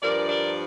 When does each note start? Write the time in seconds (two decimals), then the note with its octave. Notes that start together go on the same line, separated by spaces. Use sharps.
0.02 G2 F3 A#4 D5
0.29 A#4 D5